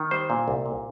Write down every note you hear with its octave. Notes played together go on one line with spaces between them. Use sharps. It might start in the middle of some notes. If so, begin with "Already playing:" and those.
Already playing: D#3
G3 C5
A#2
C2
A#2